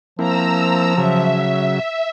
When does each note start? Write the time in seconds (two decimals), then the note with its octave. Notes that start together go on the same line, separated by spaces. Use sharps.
0.19 F3 A#3 C4 E4 A#5 E6
0.98 C#3 F#3 E5